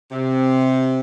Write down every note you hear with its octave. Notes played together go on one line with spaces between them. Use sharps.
C3